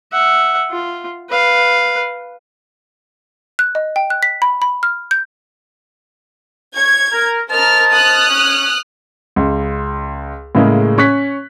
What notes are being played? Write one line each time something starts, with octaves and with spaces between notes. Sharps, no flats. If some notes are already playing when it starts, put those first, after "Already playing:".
E5 F#5
F4
B4 F5
F#6
D#5
G5
F#6
B6
B5
B5
F6
G6
C#5 G#6
A#4
A#4 C5 D#5 A5 F6
D#6 F6 F#6
C#4
C#2
A2 C#3 G#3 A#3
C#4 C#6 F#6 B6